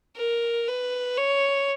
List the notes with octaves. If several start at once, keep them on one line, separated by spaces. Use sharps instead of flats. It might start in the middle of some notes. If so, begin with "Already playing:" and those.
A#4
B4
C#5